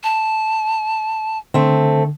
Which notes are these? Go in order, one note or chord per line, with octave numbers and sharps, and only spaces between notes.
A5
D3 A3 C4